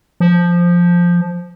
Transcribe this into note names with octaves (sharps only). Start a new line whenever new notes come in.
F3